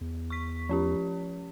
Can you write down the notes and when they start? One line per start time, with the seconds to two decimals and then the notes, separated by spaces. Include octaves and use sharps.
0.01 E2
0.30 C#6 B6
0.69 F3 C#4 G4